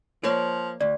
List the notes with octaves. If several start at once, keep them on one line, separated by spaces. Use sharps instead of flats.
F3 A#3 C#5 D5
D2 D5